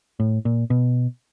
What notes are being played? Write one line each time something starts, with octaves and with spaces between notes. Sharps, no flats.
A2
A#2
B2